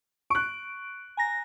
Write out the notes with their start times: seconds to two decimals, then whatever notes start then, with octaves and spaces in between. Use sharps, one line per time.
0.30 C#6 F#6 D7
1.17 G#5 A#5 A#6